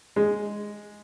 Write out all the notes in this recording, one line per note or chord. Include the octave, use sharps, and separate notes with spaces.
G#3